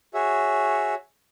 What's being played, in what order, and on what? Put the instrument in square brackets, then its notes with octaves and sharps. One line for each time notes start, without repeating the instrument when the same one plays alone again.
[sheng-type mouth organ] F#4 G#4 C#5 E5